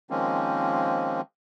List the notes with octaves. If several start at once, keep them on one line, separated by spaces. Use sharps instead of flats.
D#3 F3 G#3 A#3 C4 C#4